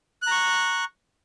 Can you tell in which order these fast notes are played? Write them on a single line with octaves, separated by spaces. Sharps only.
F#6 A#5 C#6